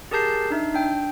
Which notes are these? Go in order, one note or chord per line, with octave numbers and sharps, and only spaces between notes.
G4 G#4 A#4 A5 G6 C7
D4 D#4 E5
D4 G5